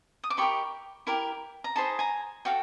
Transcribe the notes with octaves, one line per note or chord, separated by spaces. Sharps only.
D#6
D6
D#4 G4 A#4 B5 C#6
E4 G4 A#4
A#5
D#4 G#4 C5 D#5 A5 B5
G#5 A#5
F#4 A4 F5 G5